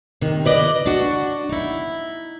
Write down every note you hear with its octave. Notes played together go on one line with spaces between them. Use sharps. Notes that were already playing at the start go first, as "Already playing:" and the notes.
C3 D#3
E4 B4 D5 D#5
D4 F#4
D#4 E4